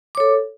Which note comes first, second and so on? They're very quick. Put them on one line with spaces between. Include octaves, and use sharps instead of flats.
D6 C#5 A4